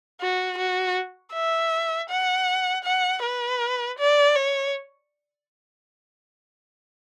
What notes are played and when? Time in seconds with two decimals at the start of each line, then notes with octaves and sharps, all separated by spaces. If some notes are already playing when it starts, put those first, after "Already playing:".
0.21 F#4
0.58 F#4
1.33 E5
2.10 F#5
2.84 F#5
3.23 B4
3.98 D5
4.36 C#5